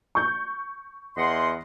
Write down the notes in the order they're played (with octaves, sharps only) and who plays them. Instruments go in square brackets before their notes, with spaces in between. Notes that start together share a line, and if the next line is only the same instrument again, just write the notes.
[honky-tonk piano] C#6 G6
[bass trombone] E2 [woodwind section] D#5 F#5 C6